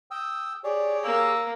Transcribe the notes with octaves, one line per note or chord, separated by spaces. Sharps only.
G5 D#6 E6
G4 G#4 C#5 D5
A#3 E6